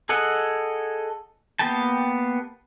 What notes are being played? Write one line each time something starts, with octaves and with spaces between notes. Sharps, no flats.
G#4 A4 D#5 F#5
A#3 B3 G4 G5 A5